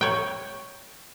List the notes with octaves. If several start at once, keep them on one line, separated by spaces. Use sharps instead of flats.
C#5 G5